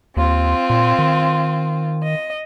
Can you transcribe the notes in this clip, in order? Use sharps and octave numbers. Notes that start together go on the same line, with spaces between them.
D#2 C4 F4
A#2
D#3
D#5